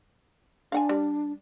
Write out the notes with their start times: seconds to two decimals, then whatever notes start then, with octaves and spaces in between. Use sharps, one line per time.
0.72 D4 F5 F#5 G#5
0.89 G3